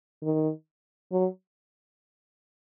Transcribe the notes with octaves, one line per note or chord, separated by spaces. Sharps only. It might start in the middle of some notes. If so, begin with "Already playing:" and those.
D#3
F#3